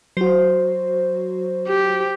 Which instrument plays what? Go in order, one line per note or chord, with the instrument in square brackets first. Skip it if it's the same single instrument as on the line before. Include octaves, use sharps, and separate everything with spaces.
[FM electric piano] F#3 F#4 [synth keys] C5
[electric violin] G4